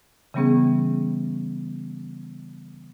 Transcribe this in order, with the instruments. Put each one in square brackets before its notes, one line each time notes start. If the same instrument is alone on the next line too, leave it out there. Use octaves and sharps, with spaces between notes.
[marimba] C#3 E3 G3 B3 C#4 G#4